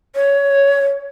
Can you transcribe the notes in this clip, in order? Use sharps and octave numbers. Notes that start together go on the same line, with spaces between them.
C#5